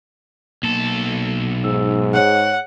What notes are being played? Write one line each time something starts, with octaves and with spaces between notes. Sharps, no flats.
B1 A#3 A4
G#2 E6
G#4 C#5 F#5